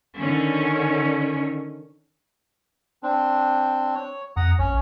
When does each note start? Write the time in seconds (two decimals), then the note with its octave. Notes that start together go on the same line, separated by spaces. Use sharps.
0.20 D3 D#3 C#4
3.03 C4 D4
3.95 C#5
4.37 F2 F#5 A#5 D#6
4.59 A#1 C#4 C#5